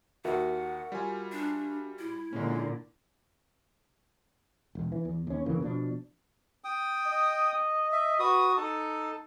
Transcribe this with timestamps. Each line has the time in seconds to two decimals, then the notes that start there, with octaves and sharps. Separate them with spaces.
0.25 D#2 F#4 A#4 E5 F#5
0.92 G3 F4 G#5
1.32 D4
1.99 E4
2.33 A#2 D3 G#3 C#4
4.75 E1
4.92 E3
5.05 E2
5.27 D#2 C#4
5.46 F2 C#3 E3 A#3
5.60 B2 F3 D4
6.64 G5 D#6
7.06 D#5
7.92 E5
8.19 F#4 B4 D#6
8.57 D#4 A4 A5